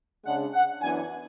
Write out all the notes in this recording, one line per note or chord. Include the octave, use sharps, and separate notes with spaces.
C#3 G#3 D4 F#5
F#5
F#2 E3 B3 D4 G#5